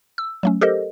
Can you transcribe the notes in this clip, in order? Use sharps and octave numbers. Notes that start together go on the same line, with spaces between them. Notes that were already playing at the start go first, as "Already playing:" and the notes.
E6
F#3 A3 C#4
G4 A4 A#4 C5 D#5